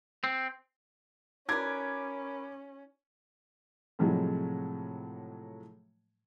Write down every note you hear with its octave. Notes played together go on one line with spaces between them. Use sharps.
C4
C#4 D#4 F#4 A#4 B4 D5 D6 G#6
A2 C3 F3 F#3 G#3